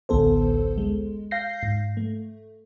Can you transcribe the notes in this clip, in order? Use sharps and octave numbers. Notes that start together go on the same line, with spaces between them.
A1 D2 B3 A4 C5
G#3
F5 G6 A#6 C7
G#2
A3